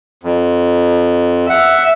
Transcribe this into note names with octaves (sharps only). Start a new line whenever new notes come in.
F2
E5 F#5